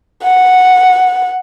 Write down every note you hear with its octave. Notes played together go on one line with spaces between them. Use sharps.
F#5